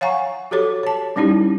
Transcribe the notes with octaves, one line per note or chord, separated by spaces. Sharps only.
C#5 F5 F#5 G#5 A#5 C#6
F#4 G4 A4 C#5 D6
C#5 A5
G3 C#4 D#4 E4 G4